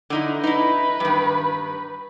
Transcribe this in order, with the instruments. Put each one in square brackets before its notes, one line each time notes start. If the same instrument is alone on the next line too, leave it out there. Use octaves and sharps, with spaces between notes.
[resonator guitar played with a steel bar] D3 D#4 E4
[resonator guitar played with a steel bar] D#4 E4 [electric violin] B4
[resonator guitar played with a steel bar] G2 D#3